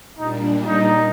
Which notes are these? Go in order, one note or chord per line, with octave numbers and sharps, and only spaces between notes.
A#2 G3 D4 D#4
D#4